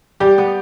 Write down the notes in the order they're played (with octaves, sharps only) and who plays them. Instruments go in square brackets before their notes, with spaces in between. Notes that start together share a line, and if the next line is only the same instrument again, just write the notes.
[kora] G3 [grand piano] G4
[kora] B3